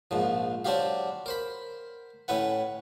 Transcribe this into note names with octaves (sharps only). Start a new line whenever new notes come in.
A#1 G#2 F3
F#3 C4 D4 F#4 G4 F5
A#4 C5 B5
A2 C#4 E4 B4 F#5